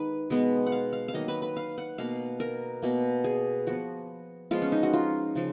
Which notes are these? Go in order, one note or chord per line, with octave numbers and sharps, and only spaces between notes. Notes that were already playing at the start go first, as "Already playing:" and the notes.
Already playing: D#3 G#3 B3 D#4 B4
B2 G#3 B3
F#5
F5
F5
F5
D#3 F#3 A#3 D#5
B4
B4
F5
F#5
B2 A#3 F5
A#4
B2 A#3
G#4
F3 B3 F#4
F3 G#3 B3 F4
C#4
D#4
F#4
F4
C#3 F3